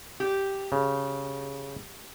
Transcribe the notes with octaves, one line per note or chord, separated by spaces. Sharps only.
G4
C#3